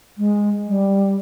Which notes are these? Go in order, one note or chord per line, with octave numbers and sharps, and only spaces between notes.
G#3
G3